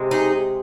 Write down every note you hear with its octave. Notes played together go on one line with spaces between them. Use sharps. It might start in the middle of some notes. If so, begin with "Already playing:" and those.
Already playing: C3 G#3
D#4 G#4